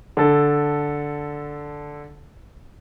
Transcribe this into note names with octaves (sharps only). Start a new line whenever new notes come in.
D3 A4